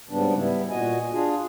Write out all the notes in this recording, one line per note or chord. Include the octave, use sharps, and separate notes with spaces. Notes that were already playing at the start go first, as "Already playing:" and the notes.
G#2 C#3 G3 B3 D4
G3 B3 E4
A#2 F#4 D#5 G#5
D4 F4 G#4